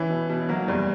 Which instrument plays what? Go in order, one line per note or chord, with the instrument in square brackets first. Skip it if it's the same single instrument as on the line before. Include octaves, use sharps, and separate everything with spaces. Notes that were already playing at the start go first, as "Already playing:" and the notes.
Already playing: [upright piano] E3 E4 [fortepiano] C#4
[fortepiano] B2
B2
[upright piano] F#3 F#4 [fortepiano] A#3
[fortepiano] E2 [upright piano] G3